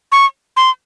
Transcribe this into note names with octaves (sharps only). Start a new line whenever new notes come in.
C#6
C6